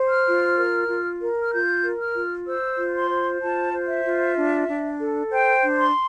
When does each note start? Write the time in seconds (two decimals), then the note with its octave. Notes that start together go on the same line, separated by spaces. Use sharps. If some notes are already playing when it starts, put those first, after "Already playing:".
Already playing: C5
0.09 F6
0.26 F4
0.56 A#4
0.88 F4
1.20 A#4
1.43 F6
1.52 F4 G6
1.83 A#4
1.99 F6
2.15 F4
2.46 C5 E6
2.78 F4
2.94 C6
3.10 C5
3.41 F4 A5
3.73 C5
3.88 E5
4.04 F4
4.37 D4
4.68 D4
4.99 A4
5.31 C5 G5
5.63 D4
5.78 C6